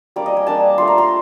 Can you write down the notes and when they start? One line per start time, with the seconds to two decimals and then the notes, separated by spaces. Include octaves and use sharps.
0.16 G3 A#3 D4 D5
0.26 D#5
0.37 G#5
0.47 G3 A#3 D4 A5
0.78 A3 D4 F4 C6
0.88 A#5
0.98 C6